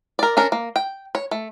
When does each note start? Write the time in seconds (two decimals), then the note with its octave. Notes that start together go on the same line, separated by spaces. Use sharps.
0.19 A#4 D5
0.37 C#4 D4 A#4
0.52 A#3
0.76 G5
1.15 C#5
1.31 A3